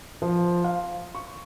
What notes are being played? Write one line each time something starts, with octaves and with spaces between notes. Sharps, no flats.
F3
F5
C#6